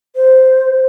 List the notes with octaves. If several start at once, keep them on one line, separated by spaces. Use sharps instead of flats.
C5